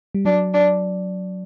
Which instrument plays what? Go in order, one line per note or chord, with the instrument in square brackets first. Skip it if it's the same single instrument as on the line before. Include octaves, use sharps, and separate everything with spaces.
[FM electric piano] G3
[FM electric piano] F#3 [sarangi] D4
[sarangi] D4